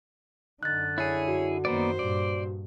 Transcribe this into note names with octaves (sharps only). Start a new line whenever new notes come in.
F#2 D3 D#4 F#6 A6
E4 G#4 C#5
F#4
F#2 D#3 A#3 B3 C5 D5
G2 A#2 D5